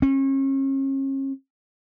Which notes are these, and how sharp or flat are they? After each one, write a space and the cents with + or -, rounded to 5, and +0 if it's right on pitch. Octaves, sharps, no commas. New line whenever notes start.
C#4 -40